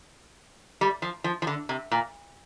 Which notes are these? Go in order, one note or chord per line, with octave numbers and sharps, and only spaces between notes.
G3
F3
F3
F3
D3
C3
A#2